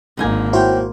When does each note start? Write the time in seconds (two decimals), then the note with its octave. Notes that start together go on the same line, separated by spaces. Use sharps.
0.17 G#1 D3 A#3 D#4 G#5
0.53 E4 F#4 C5 C#5 G5